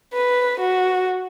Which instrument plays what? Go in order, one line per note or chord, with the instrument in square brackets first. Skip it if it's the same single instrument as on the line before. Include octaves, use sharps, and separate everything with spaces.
[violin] B4
F#4